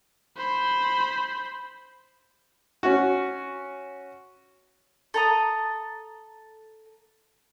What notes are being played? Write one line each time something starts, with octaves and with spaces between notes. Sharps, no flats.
C5 B5
C#4 F#4
A4 A#5 D#6